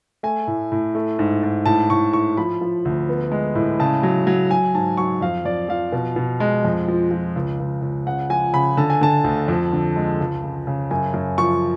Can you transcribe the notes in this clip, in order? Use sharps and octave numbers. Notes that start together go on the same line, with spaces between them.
A3 G#5
A2
A2
A3
G#2
G#2
A2 A5
A2 C#6
A2 C#6
F3 B5
F3
D2
B3
G#3
A2
C#3 A5
F#3
F#3
F#3 G#5
G#2 A5
F#3 C#6
F2 F5
F2 D5
F3 F5
B2
B2
G#3
F2
F3
F3
C#2
C#2
C#2
C#3 F#5
F3 G#5
C#3 B5
D3 A5
G#5
D3 A5
D2
F2
D3
G#3
C#2
C#3
C#3
F#2 G#5
F#2
F3 C#6